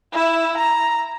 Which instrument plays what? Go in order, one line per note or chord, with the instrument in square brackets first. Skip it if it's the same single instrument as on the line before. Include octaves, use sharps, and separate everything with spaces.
[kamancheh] E4 E5
A#5